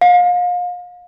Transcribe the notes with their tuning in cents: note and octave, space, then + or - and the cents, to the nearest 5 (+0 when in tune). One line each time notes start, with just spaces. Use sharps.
F5 +35